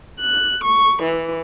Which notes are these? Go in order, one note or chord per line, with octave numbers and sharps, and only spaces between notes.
F#6
C#6
E3